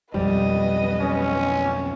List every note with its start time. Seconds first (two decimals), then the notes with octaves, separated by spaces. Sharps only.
0.14 B1 F2 G3 B4 D#5
1.00 C#4